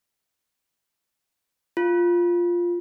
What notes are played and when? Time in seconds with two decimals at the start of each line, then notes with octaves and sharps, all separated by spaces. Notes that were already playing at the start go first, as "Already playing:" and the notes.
1.77 F4